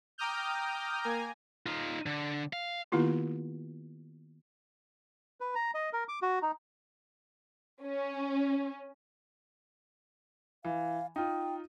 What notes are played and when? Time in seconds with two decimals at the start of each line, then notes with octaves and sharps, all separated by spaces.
0.18 G5 A#5 D6 D#6 F6 G6
1.02 A#3 G#5 A#5
1.66 D#4 F4
2.06 D3
2.53 F5
2.92 D#3 A#3 B3 E4 F4 G4
5.41 B4
5.55 A#5
5.74 D#5
5.93 A#4
6.08 D6
6.22 F#4
6.42 D#4
7.83 C#4
10.65 E3 F5
11.16 D#4 F4 G5